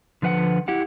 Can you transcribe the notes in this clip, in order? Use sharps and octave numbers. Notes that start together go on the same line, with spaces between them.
D3 F3 B4 F5 F#5
E4 G4 F#5